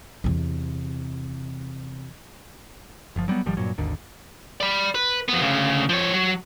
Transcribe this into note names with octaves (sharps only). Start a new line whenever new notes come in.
E2 C3
F#1 F3
F#3 G3 A3 B3
G#1 D#3 F3 G3
G2 A#2 F#3
G#1 D#2 D3
D5 B5
B4
F2 B3
D2 C#3
F3 C#5
F#3